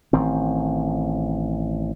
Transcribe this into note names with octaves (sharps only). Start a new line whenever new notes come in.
A1 D#3 C4